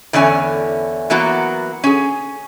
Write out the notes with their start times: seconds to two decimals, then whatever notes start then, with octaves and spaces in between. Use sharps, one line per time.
0.13 E2 D3 E3 C#4 C#5 G#5
1.10 E3 F#3 A#3 B3 F#4
1.84 C#4 G#4